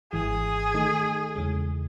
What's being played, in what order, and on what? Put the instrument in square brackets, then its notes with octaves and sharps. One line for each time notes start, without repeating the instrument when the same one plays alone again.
[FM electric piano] G#1 G#2 E3 [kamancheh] G#4
[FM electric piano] D#3 A3 D#4 A4
E2 C#3 G#3